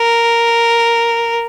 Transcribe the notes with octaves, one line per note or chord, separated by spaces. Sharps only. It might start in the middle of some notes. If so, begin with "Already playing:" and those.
Already playing: A#4